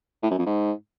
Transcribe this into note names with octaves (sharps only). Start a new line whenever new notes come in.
A2
F#2
F2
G#2